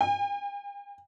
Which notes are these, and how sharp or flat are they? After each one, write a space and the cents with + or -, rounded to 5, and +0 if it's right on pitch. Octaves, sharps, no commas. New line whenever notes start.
G5 +45